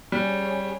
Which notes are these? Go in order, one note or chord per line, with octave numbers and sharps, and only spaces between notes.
G3 C#4 G#4 C#5